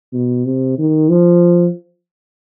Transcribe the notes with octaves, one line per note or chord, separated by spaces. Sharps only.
B2
C3
D#3
F3